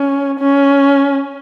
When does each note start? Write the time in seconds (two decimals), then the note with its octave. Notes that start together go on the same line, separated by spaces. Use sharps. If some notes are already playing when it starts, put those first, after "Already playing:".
Already playing: C#4
0.39 C#4